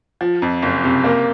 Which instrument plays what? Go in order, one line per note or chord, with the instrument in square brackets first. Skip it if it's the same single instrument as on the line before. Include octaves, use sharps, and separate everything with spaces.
[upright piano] F3
F2
F#1
C3
A#3